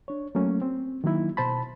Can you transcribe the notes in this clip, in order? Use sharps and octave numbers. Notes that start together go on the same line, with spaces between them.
D4 C#5
F#3 A3 A#3 C#4
C4
D#3 F#3 A#3 D#4 E4
B2 C5 A5 B5